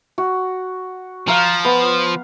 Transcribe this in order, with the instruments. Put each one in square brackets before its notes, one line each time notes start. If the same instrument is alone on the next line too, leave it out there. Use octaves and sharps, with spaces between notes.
[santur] F#4
[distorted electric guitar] F3 [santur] F5 A#5
[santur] B3